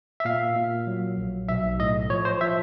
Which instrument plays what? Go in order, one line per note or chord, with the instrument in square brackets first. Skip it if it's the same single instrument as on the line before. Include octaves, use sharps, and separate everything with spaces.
[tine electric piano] E5
A#2 F5
A#2
F#3
A#1
B1 E5
A2 D#5
F3 C#5
C5
F3 E5